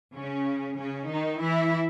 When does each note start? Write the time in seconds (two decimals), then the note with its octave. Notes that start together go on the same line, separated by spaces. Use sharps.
0.16 C#3 C#4
0.78 C#3 C#4
1.10 D#3 D#4
1.41 E3 E4